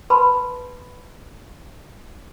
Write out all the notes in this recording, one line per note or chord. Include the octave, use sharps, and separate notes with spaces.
B4 A5 B5 C6